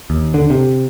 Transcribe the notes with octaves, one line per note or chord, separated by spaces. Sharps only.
D#2
D3
C3